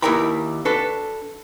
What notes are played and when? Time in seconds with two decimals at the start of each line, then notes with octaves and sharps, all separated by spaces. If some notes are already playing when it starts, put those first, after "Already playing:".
0.02 D#2 E4 A#4 G5 A#5 B5
0.65 D4 F#4 A4 B4